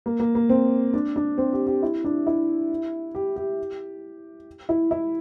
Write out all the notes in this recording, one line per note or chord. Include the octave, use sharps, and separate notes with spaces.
A#3
A#3
A#3
C4
D4
D4
C4
G4
G4
E4
D4
E4
G4
G4
E4
E4